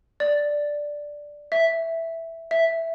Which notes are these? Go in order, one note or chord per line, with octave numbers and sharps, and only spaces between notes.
D5
E5
E5